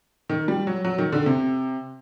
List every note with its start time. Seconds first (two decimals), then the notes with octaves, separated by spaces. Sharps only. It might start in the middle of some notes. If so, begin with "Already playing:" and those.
0.30 D#3
0.48 G3
0.67 F#3
0.85 F#3
0.98 D#3
1.12 D3
1.26 C3